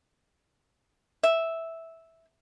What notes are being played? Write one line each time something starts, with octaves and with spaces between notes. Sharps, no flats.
E5